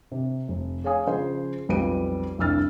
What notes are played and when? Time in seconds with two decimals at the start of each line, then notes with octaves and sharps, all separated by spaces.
0.12 C3
0.48 F1
0.84 G#4 C#5 F5 G#5 D#6
1.07 C#3 F3 G#4 C5
1.69 B1 F2 G3 B4 D7 D#7
2.38 F1 C2 G2 E6 F6 A6